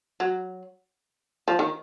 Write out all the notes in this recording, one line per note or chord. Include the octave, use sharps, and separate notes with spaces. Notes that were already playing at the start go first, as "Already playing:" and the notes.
F#3
F3
D#3